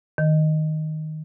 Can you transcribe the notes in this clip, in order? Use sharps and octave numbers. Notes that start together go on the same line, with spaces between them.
D#3